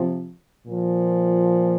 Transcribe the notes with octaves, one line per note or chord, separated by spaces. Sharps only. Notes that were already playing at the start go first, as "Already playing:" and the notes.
Already playing: C3 F3
A#2 F3